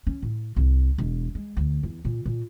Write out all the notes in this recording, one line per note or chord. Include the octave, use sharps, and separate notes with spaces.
C#4
A2
C2
E1
G#3
D2
E2
A#2
A#2